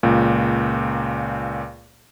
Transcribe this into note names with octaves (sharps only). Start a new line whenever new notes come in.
C#2 A#2